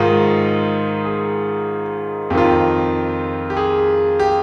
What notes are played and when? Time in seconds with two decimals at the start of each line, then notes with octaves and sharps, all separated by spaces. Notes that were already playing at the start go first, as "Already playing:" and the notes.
Already playing: G#2 D#3 F4
1.05 G#4
2.30 F2 G4
2.35 D#3 F4
2.45 G4
3.50 G4
3.57 G#4
4.20 G4